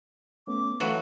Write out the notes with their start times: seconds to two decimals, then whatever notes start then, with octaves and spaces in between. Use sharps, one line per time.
0.47 A3 B3 C#4 D6
0.80 E3 F#3 A3 F#4 A4 B4 F5